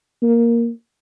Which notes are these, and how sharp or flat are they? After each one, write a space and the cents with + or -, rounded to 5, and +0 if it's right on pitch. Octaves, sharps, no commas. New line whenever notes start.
A#3 +5